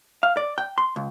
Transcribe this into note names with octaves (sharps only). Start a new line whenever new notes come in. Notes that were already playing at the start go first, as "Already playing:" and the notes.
F5
D5
G5
C6
C#2